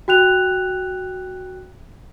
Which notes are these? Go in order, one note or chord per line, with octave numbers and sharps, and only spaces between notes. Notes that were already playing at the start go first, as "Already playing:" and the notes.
F#4 G5 F#6 F7